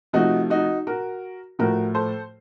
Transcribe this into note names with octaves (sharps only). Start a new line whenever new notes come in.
C3 F3 A3 D#4 F#4
D#4 F#4
F#4 A#4
A2 F3 A3 F#4 A#4
A4 C5